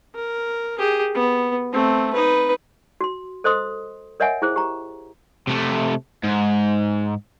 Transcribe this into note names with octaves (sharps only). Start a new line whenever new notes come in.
A#4
G4 G#4
B3
A3 C4
D#4 B4
F#4 C6
A4 C5 D#5 C6 D#6
A#4 C#5 D#5 E5 F#5 G#5
E4 G#4 C5
G4 A#5
C3 A3
G#2